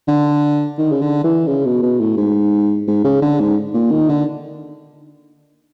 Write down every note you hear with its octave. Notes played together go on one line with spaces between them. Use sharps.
D3
D#3
C#3
D3
E3
C#3
B2
B2
A2
G#2
G#2
C#3
D3
G#2
A#2
D#3
D3